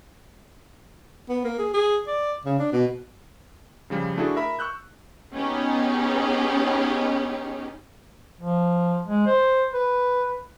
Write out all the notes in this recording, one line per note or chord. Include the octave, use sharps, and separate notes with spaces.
B3
A#3
G#4
G#4
D5
C#3
D4
B2
C#3 F3 G3
A3 D4 E4 F#4 G#4 A4
A#4 E5 B5
C#6 E6 F#6 G6
B3 C#4 D#4 G4 G#4
F3
G#3
C5
B4